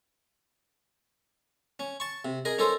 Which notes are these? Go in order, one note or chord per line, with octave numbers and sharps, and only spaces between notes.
C#4
A5 C#6
C3
G#4 A#4 D#5
C#4 D#4 A4 A#4 C5